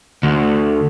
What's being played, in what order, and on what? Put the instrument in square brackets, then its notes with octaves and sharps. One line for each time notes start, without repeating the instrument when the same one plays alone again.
[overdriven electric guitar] D2